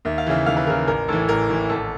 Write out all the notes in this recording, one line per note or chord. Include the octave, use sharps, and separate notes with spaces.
D#2 E5
F5
C#3 E3 E5
D#2 F5
B4
C#3 E3 A#4
A1 A#4
A2 E3 A4
A1 A#4
A2 E3
G#1 A4